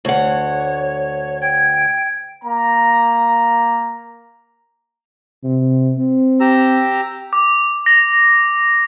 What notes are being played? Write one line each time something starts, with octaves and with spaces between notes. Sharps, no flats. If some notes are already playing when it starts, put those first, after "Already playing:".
D2 C#5 F#5
G5 G#6
A#3 A#5
C3
C4
G4 A#5 E6
D6
A#6